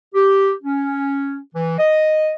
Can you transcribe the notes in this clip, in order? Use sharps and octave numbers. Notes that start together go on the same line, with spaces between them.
G4
C#4
E3
D#5